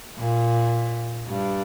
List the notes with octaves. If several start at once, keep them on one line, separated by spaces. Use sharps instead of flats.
A#2
G2